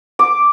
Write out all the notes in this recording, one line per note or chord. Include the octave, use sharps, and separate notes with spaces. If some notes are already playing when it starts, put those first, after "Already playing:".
D6